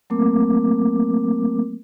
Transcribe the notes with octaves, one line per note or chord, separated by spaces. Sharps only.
F#3 A3 A#3 C4 A#4 D6